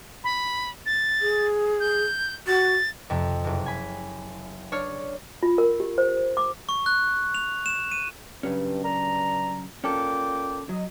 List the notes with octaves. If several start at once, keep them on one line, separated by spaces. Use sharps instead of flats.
B5
A6
G#4
G6
F#4 A6
F2 C3
F#1 C3
G#5 B5
D4 C#5 F6 C#7
F4
A#4
G4
C5
D6
C#6
F#6
F7
E7
D#7
G2 C#3 F#3 C#4
G2 D4 A#5
A#2 C#4 A4 G5 D6
F#3 D#5